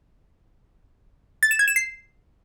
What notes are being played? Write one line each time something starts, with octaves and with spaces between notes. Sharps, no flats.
A6
E7
G#6
E7
C7